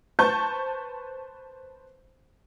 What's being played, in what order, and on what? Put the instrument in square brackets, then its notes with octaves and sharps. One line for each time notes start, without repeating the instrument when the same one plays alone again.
[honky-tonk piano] B4 C5 A5 C#6 G6 A6